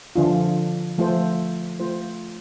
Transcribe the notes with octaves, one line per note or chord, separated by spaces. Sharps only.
D3 F3 D4 F4
F3 A3 F4 A4 C5
A3 F4 C5